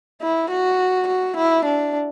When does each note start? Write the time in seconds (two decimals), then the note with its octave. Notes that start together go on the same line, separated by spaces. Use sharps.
0.21 E4
0.50 F#4
1.08 F#4
1.37 E4
1.65 D4